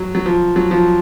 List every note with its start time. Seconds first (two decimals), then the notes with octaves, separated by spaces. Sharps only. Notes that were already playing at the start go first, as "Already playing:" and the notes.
Already playing: F#3
0.15 F#3
0.26 F3
0.56 F#3
0.71 F3